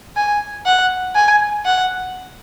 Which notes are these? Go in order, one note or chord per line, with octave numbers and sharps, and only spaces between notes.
G#5
F#5
G#5
F#5